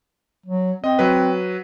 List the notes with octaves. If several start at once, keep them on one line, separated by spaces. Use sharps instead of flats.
F#3
C4 D#5
F#3 B4